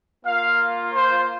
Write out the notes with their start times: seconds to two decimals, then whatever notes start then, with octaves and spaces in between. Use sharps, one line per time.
0.25 A#3 F4 F5
0.94 C5